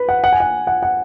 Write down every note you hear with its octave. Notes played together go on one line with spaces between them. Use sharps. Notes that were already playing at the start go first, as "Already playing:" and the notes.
Already playing: B4
F#5
F#5
G#5
F#5
F#5
F#5